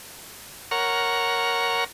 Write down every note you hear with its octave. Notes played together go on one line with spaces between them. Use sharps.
A#4 C#5 F#5 A#5 C#6 F6